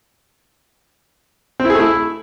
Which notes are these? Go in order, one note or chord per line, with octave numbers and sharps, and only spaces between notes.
C4
E4
G#4
A3
E4